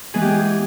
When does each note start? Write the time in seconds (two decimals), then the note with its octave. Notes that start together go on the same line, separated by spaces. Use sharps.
0.14 E3 G#3 B3 G#4
0.22 G4
0.31 G#4